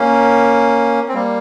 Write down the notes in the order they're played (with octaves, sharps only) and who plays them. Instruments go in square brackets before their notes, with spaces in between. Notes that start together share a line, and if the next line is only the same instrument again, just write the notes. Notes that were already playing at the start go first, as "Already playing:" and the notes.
Already playing: [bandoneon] A#3 C#4
C4
G3 A#3